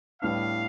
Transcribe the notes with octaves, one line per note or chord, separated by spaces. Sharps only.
A2 G3 B3 D4 F5